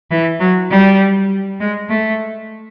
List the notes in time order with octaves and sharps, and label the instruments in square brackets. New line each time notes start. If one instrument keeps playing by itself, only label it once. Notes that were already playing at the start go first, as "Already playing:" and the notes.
[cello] E3
F#3
G3
G#3
A3